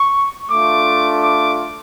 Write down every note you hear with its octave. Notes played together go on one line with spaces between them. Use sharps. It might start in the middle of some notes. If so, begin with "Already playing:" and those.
Already playing: C#6
A3 D4 F4 D6
D6